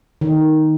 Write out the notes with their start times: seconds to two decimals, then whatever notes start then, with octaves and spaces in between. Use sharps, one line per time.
0.21 D#3